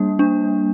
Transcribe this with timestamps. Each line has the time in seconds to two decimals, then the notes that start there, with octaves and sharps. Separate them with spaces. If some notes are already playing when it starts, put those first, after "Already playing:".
Already playing: G3 A#3 D4
0.19 D4